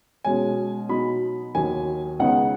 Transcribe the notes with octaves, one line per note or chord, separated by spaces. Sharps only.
B2 G#3 C#4 G#5
B2 F#3 D#4 B5
D#2 D#3 F#3 G#5
C#2 C#3 B3 D#4 F#5